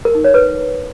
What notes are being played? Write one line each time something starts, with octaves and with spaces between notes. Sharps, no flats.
A#4
D#4
C#5
B4